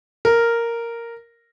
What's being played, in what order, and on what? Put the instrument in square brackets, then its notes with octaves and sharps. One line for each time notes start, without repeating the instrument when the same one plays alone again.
[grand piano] A#4